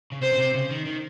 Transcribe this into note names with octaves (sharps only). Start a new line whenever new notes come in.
C#3
C3 C5
C#3
C3
C#3
D#3
D#3